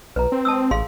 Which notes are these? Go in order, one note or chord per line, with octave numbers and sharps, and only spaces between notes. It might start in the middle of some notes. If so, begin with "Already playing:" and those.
B1 B4 A#5
C4
A5 D#6 E6
A1 G#4 F5 C6